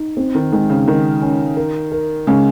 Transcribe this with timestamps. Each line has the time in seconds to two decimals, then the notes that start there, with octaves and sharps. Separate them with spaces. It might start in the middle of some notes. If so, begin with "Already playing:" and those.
Already playing: D#4
0.17 C4
0.35 D#3
0.53 D#3 G#3
0.70 C#3
0.88 D#3 A#4
1.22 C#4
1.57 A#4
1.92 A#4
2.27 C#3 G#3